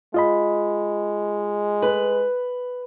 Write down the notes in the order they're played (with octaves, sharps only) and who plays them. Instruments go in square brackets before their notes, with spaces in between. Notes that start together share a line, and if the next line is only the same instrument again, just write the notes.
[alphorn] G#3 [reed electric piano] F4 D#5 B5
[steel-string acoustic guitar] B4